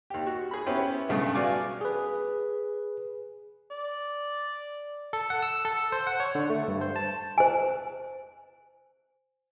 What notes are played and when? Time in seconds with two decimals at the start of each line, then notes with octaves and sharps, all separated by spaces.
0.10 D#2 G4
0.27 F#4
0.51 G#4 B5
0.66 B3 C#4 E4 G4 B4 C5
1.09 B1 G2 C#3 A3 B3
1.35 F#4 D5 F5 G#5 D6
1.81 G#4 B4
3.71 D5
5.13 A4
5.30 F#5
5.42 E6
5.65 A4
5.92 C5
6.07 F#5
6.20 C#5
6.35 D3
6.50 A3
6.68 G2
6.81 C5
6.96 A5
7.38 C5 G#5